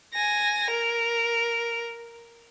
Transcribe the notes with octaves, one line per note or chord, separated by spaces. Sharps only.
G#5 A#6
A#4